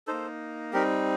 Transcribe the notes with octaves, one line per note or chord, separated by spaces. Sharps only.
A#3 D#4 A4 C5
G3 C4 D#4 G4 A#4